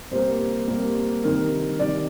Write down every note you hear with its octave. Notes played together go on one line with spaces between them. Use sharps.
C3 G3 A#3 C5
C3 G3 A#3
C3 D#3 G3 A#4
C3 D#3 G3 D5